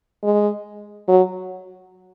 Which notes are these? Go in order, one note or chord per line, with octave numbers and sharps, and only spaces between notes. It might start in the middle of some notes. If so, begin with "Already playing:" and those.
G#3
F#3